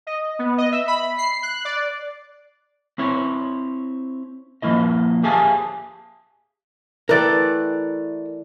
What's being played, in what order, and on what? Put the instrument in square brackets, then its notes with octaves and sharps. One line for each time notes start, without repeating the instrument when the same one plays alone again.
[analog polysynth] D#5
B3
D#5
E5
B5
C7
F#6
D5
[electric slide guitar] C4 E4 C#5
F3 A#3 E4 D#5
G4 G#4 E5 F5 G#5 A5
[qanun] E3 A3 [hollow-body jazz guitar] A#4 E5 G5 [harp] D5 F#6